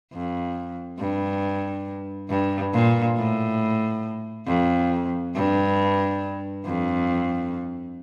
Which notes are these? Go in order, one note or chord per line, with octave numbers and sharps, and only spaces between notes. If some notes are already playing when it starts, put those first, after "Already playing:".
F2
G2
G2
A#2
A2
F2
G2
F2